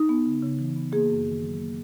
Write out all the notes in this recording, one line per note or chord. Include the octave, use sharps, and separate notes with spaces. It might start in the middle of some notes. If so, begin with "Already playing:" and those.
Already playing: D#4
B3
C#3
C#3
E3
B3
A#3 G#4
F#2
D#3
F#3
A#3